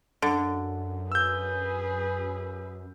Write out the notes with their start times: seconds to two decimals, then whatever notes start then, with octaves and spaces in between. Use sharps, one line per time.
0.22 F#2 D3
1.12 G#4 B4 E6 G6